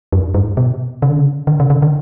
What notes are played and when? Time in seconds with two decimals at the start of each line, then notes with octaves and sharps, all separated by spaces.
0.13 F#2
0.34 G2
0.57 B2
1.02 C#3
1.10 D3
1.17 C#3
1.47 D3
1.60 C#3
1.70 C#3
1.82 D3